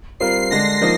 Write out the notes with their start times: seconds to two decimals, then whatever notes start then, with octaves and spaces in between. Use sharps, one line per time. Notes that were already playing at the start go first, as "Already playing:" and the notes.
0.20 G3 C4 F4 A#4 C7
0.50 D3 G#3 D4 A#6
0.82 F3 A#3 D#4